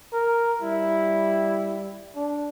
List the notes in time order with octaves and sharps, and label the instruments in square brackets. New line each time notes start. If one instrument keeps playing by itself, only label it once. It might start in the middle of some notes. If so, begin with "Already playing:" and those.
[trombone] A#4
[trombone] G3 [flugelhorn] E4
[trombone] D4